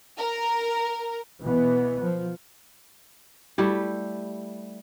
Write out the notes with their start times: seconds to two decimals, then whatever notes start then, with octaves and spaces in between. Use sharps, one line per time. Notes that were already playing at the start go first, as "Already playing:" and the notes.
0.18 A#4
1.44 B2 E3 B3
2.02 F3
3.58 G3 A3 E4 G4